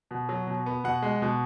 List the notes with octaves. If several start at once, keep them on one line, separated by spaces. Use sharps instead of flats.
B2
F#3
B2
B3
B2 F#5
G#3
B2